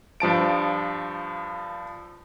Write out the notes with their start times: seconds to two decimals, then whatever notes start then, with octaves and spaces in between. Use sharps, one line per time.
0.20 G2 F3 A5 D7